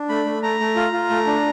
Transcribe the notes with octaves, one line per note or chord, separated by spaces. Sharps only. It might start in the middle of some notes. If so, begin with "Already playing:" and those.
Already playing: D4
A3 B5
A3
A3 A#5
A3
F4
F4
A3
D4